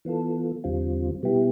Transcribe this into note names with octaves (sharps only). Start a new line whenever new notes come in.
E3 B3 F4 A4
E2 D3 G3 C4 F4
B2 G3 B3 E4 G4